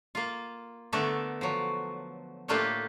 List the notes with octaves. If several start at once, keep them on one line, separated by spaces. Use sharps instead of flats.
A#3 F4
D3 A3 B3 A#4 D5 E5
F3 F#3
A2 A3 A#3 D4 F4 G4